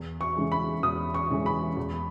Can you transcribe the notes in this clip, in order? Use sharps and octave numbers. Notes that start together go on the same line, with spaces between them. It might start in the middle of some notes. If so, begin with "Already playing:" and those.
Already playing: E2
C#6
C#3 E3 G#3
B5
E2 D#6
C#6
C#3 E3 G#3
B5
E2